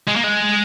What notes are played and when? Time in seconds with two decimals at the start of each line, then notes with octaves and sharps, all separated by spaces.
0.08 G#3
0.16 A#3
0.24 G#3